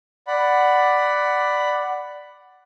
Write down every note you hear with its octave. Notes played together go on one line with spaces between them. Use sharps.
D5 F#5 B5